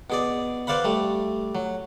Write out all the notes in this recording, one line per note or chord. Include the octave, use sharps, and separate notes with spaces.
B2 G#4 D5
B4 C5 D5 F5 F#5 B5
G3 A3
F#3